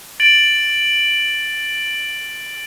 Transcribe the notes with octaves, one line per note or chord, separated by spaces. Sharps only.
A6 D7 F#7